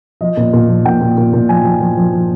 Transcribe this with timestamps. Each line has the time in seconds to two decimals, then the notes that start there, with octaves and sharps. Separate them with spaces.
0.21 F3 D#5
0.37 A#2
0.53 A#2
0.69 F3
0.85 A#2 G5
1.01 A#2
1.17 A#2
1.33 A#2
1.49 F3 G#5
1.65 F3
1.81 F3
1.97 F3
2.13 F3